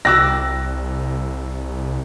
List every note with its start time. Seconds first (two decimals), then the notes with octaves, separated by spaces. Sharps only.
0.05 C2 D5 G5 D6 E6 F#6 A#6